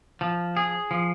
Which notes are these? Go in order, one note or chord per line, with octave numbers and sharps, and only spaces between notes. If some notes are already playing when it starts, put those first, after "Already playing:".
F3
G#4
F3